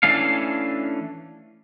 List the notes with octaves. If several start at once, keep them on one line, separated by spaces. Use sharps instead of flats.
E3 A3 C#4 D4 F5